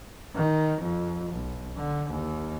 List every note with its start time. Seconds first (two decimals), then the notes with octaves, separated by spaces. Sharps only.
0.36 D#3
0.82 F2
1.31 B1
1.77 D3
2.10 D#2